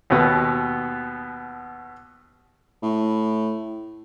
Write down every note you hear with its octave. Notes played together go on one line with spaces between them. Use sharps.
D#2 B2 B3
A2